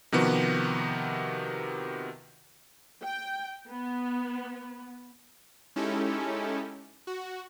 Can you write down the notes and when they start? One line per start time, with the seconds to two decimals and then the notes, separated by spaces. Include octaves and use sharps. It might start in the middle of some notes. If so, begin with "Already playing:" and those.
0.12 C3 D#3 F3 B3 F#4 G4
3.02 G5
3.70 B3
5.76 G#3 C#4 D#4 E4 G4 A4
7.07 F#4